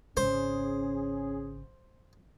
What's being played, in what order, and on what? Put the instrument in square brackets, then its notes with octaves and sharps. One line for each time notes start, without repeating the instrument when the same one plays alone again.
[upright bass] G#1 C#3 [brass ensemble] C#4 G#4 [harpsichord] C5